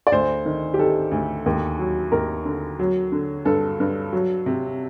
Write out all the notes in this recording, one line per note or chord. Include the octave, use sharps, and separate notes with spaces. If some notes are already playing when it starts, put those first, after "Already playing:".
D5
D2 C5
D#3
G4
D#3 A4
D2
D#2
F#3
D#2 A#4
D3
F#3
D3
G2 A4
G2
F#3
C3